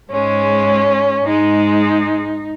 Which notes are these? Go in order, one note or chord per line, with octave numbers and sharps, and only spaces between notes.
G#2 G#3 C#4
G#2 G#3 D#4